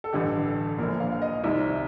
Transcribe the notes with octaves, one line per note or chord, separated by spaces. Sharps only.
A4
A1 G2 D3 G4
A4
A#1 A#2 A#4
F5
F5
D#5
C2 C3 D#3